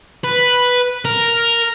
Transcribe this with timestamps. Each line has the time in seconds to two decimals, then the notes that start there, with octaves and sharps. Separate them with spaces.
0.24 B4
1.05 A#4